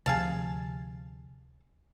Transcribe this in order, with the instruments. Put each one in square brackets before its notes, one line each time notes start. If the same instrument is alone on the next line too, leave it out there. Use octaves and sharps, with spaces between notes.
[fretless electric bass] D2 C3 F3 [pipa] G#4 F5 A5